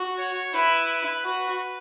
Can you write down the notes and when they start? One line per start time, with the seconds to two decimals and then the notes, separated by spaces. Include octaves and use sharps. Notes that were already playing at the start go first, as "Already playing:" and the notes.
Already playing: F#4
0.19 C#5
0.54 E4 B4
1.25 F#4 B4